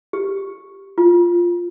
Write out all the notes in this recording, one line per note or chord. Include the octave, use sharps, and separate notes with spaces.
G4
F4